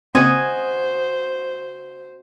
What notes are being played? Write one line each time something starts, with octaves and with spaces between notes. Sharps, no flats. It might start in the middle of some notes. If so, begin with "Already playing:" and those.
C#3 A#3 C4 F#4 C5 D#5 G#5